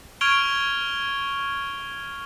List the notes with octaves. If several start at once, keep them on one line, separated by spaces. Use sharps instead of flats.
C#6 F6 G#6 D7 F7 G7